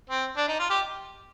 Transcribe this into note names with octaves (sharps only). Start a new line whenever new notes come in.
C4
D4
D#4
F4
G4